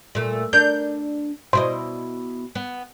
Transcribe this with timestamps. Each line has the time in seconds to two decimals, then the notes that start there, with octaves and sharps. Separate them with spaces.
0.15 A#2 A3
0.53 D4 A#4 G6
1.53 B2 E4 C5 D#5
2.55 B3